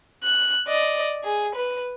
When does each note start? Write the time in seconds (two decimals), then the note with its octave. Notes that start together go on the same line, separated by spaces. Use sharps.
0.24 F#6
0.68 D5 D#5
1.24 G#4
1.55 B4